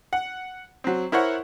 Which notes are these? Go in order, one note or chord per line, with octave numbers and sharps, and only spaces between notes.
F#5
F#3 C4
E4 A#4 C5 C#5 F#5